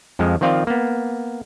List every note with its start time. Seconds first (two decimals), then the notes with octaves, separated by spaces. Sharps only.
0.19 F2 F3 G#3
0.41 D#3 F3 C4 F4 D5 F5
0.67 A#3 B3